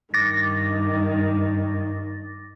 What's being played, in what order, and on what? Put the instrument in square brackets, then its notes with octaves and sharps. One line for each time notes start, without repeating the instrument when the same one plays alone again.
[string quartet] G2 D#3 [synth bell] D6 A6 A#6